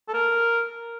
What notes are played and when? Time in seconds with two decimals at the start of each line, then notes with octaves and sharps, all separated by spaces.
0.09 A4
0.14 A#4